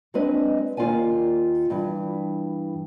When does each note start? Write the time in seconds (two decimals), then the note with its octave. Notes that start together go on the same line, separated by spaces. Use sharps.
0.14 F#3 G#3 C4 D4 B4 D#5
0.77 D#2 C#4 F4 A#4 D5 G#5
1.70 G2 E3